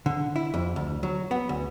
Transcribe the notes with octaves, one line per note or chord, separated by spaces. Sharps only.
D3
E4
F2
D2
F#3
B3
D2